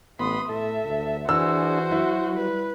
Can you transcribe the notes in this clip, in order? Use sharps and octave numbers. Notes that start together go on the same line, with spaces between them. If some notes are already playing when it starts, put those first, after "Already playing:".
A1 B3 B5 C6 D#6
A2 A4 E5
D2
E3 D4 F#4 G#4 C5 E6
F#3 E4
G3 B4